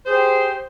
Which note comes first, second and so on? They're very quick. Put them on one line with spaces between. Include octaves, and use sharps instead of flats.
C5 G#4 G4